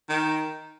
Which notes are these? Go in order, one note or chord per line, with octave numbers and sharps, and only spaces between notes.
D#3